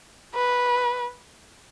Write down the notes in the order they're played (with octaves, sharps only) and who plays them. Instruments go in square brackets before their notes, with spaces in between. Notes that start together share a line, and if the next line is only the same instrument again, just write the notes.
[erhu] B4